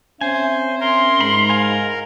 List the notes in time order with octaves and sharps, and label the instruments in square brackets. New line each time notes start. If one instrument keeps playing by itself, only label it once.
[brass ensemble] C4 C#4 E5 [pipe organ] C5 [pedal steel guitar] G#5
[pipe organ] A#4 [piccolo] C6
[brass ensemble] G#2 [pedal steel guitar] B5
[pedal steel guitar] F5 G#5